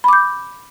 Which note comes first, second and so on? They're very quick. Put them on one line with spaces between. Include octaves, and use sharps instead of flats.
B5 D6 G6